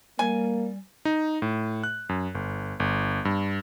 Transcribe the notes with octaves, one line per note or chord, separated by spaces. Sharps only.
G3 A#3 G#5
D#4
A2
F#6
F#2
G1
G1
G2